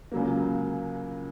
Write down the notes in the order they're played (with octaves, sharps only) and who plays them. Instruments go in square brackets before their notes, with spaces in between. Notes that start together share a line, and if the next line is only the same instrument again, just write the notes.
[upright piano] C#2 C#3 F#3 A#3